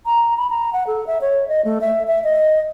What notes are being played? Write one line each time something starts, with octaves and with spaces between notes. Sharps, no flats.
A#5
B5
A#5
F#5
A4
E5
C#5
D#5
A3
E5
E5
D#5